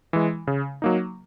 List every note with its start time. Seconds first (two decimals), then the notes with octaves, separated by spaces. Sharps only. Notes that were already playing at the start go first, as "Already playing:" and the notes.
0.13 E3 G#3
0.47 C#3
0.82 F#3 A#3 D#4